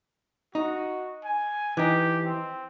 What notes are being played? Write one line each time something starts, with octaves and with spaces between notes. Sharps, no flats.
D#4 F#4
G#5
E3 D#4 G4
C4